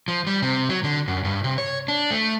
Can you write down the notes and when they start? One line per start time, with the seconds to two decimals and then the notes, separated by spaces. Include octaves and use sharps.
0.08 F3
0.27 G3
0.42 C3
0.69 F#3
0.84 D3
1.08 F#2
1.25 G2
1.44 C3
1.58 C#5
1.88 D4
2.11 A3